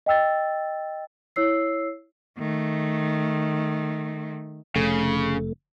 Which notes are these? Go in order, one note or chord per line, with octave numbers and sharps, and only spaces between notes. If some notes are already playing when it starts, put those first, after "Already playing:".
D#5 G5 E6 A6
E4 C#5 E6 C7
D#3 A3
F1 C#3 A3